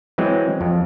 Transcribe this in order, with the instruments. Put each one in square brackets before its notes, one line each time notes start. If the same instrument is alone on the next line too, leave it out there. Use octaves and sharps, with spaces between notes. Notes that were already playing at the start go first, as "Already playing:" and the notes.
[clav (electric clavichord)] E3 F#3 G#3 C4
F2